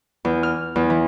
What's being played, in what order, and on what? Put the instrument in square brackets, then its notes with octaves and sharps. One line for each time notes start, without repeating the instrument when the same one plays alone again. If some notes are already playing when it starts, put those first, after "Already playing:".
[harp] E2
F6
E2
E3